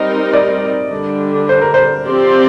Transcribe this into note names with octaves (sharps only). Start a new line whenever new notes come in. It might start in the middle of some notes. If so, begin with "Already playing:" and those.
Already playing: G3 C4 D#4 A#4 D#5
D5
D3 G3 D4
C5
A#4
C5
F3 C4 G4 D5